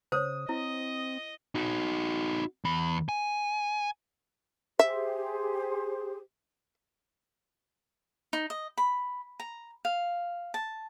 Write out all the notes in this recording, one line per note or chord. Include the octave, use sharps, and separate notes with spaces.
C#3 C5 C#5 D#6
C4 E4 D#5
D#4 F#4
E2 B5
G#5
G4 G#4 C5 E5
D#4
D#5
B5
A#5
F5
A5